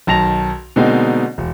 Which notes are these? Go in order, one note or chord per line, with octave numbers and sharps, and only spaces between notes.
B1 D#3 A5 A#6 F7
B2 D3 G#3 A#3 C4 D#4
E1